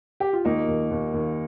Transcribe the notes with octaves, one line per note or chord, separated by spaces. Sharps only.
G4
F4
D#2 A#3 D#4
D#2
D#2
D#2